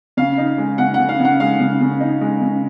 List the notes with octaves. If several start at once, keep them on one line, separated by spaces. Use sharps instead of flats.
C#3 F5
D#4
G#3
C#3 F#5
C#3 F#5
F5
C#3
F#5
G#3 F5
C#3
C#3
D#4
G#3
C#3